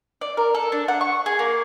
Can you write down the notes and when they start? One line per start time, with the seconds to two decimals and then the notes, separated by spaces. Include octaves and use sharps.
0.21 D5
0.37 A#4
0.55 A4
0.72 D4
0.88 F#5
1.01 C#6
1.26 G#4
1.39 A#3